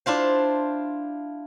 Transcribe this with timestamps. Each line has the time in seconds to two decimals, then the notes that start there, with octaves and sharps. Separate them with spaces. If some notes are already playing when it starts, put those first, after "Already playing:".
0.06 D4 E4 F4 C5